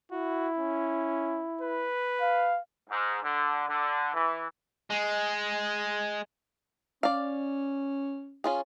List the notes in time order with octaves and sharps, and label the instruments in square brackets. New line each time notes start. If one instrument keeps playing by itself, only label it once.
[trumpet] E4 [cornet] F#4
[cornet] C#4
B4
[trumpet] F5
[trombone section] G#2
D3
D3
E3
[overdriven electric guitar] G#3
[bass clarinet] C#4 [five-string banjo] D5 F5
[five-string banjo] C#4 F4 G#4